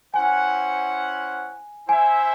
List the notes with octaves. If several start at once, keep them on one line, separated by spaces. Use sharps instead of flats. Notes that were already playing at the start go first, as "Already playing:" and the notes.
C#4 E4 C5 F#5 G#5
E4 C5 E5 G#5